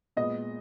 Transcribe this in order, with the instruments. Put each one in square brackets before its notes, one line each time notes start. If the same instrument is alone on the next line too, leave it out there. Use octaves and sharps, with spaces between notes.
[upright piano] A#2 G#3 B3 D#5